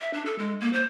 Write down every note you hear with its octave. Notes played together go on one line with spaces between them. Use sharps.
E5
D4
A4
G#3
A#3
C5